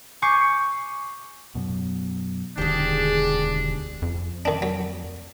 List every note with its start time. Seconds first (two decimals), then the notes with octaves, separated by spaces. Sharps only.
0.22 G#5 C#6 D6 G6 C7 C#7
1.55 F#2 B2
2.58 E1 D2 D#3 D4 G4 G#4
4.02 F2
4.45 D#3 D4
4.62 F#3